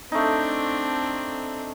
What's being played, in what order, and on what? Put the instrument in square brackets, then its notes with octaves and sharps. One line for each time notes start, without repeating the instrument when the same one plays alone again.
[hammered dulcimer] A3 D#4 [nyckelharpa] C4 D4